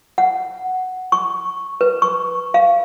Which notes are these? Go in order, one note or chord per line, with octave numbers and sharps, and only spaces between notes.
F#5
C#6
B4
C#6
F5